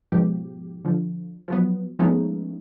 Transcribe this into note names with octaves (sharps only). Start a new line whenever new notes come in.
G#2 B2 F3 G4
D3 F3
F3 F#3 B3
F3 G#3 A3 B3 C#4 D#4